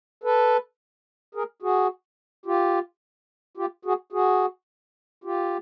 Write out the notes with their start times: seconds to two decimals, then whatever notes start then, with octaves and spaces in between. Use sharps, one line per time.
0.23 A4 B4
1.35 G#4 A#4
1.62 F#4 G#4
2.46 F4 G4
3.57 F4 G4
3.85 F#4 G#4
4.12 F#4 G#4
5.24 F4 G4